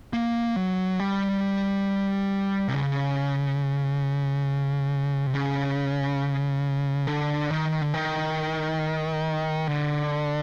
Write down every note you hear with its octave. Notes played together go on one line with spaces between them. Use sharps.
A#3
F#3
G3
C3
C#3
C3
C#3
D3
D#3
D3
D#3
D3